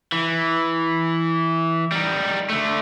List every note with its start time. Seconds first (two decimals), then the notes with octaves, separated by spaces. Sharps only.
0.12 E3
1.92 G3 D#4
2.49 D3 A3